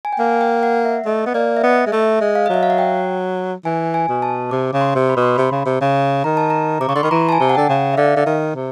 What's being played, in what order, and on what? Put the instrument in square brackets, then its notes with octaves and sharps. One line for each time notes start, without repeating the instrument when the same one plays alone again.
[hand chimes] G#5
G5
[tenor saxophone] A#3 [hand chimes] F#5
[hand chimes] G5
F#5
E5
[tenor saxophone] A3 [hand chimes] D#5
[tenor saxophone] B3
[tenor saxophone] A#3 [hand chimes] D5
[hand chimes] E5
[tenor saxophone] B3 [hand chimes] D#5
[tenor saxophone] G#3
[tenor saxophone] A3 [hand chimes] E5
[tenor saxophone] G#3
[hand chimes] F5
D#5
[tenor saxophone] F#3 [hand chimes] E5
[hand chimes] F5
F#5
G5
[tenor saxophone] E3 [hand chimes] G#5
[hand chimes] G#5
[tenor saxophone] B2
[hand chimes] A5
[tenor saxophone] C3 [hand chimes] D6
[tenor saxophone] C#3
[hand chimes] C6
[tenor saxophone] C3
[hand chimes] B5
[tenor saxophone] B2
[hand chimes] C6
[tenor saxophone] C3 [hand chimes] B5
[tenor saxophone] C#3
C3
C#3
[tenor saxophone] D#3 [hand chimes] A#5
[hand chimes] A5
A#5
[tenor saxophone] C3 [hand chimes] D6
[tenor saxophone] C#3 [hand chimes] C#6
[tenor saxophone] D3 [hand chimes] C6
[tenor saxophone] D#3 [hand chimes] B5
[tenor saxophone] E3 [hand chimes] A#5
[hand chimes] A5
G#5
[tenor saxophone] C3
[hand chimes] F#5
[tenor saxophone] D3 [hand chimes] G5
[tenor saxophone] C#3
[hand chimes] E5
[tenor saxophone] D3 [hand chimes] F5
[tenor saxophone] D3
D#3
C3